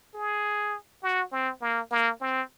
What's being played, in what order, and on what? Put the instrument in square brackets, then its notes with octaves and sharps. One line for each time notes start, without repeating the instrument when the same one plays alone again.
[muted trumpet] G#4
F#4
C4
A#3
A#3
C4